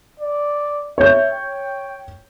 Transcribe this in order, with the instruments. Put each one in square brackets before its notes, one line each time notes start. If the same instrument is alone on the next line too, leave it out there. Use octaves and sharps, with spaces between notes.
[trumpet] D5
[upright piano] C#5 G6 [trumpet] E5
[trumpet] G5